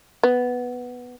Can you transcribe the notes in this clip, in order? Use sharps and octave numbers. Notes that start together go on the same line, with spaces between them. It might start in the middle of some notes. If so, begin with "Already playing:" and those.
B3